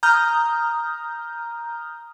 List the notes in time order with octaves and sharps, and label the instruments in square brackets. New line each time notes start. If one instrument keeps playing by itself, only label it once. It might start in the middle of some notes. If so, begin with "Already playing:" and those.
[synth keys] A#5 D#6 F6 G6